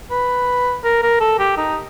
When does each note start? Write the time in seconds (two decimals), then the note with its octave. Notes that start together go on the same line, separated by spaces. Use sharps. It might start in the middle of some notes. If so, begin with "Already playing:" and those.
0.11 B4
0.84 A#4
1.02 A#4
1.20 A4
1.39 G4
1.57 D#4